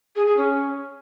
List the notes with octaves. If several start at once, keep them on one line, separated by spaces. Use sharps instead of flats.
G#4
G#4
C#4